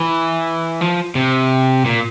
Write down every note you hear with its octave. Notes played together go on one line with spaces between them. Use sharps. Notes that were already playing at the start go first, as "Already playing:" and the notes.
Already playing: E3
F3
C3
A#2